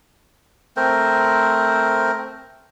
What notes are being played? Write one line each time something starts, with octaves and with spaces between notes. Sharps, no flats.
A3 C4 A#4 C5